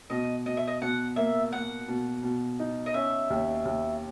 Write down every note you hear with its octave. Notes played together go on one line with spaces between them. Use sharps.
B2 D#5
B2 D#5
E5
D#5
B2 F#5
A#3 E5
A#3 F#5
B2
B2
D#4
D#5
C#4 E5
D#2
D#2